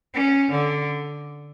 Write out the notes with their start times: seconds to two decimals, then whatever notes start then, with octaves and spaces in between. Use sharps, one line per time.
0.14 C#4
0.52 D3